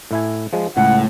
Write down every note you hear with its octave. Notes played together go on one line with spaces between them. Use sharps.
A2 E4 G#5
F3 G#3
C#2 A2 F#5